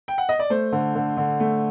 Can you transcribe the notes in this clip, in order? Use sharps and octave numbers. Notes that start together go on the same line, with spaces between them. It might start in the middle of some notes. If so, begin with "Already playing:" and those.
G5
F#5
D#5
D5
A3 C5
D3
D3
D3
A3